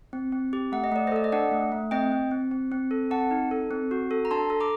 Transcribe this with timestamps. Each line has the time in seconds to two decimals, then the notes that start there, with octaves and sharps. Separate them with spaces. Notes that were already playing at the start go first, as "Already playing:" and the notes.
0.13 C4
0.32 C4
0.53 G4
0.72 A3 F#5
0.84 D#5
0.92 A3 D5
1.07 C5 D#5
1.12 A4 D5
1.24 D#5
1.32 D4 D5 F#5
1.51 A3
1.72 A3
1.91 C4 D#5 G5
2.12 C4
2.31 C4
2.51 C4
2.72 C4
2.91 A4
3.11 C4 F#5 A5
3.31 D#4
3.51 A4
3.71 C4
3.91 F#4
4.11 A4
4.25 A#5
4.31 D4 A5 C6
4.50 A4
4.60 A#5 D6